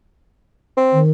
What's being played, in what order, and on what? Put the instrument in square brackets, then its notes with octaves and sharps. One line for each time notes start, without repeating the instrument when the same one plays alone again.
[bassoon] C4
[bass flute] D#3